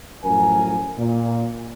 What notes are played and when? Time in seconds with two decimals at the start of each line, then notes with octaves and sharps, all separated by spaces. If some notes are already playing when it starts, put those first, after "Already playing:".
0.24 F#2 A2 F3 A#4 G#5
0.98 A#2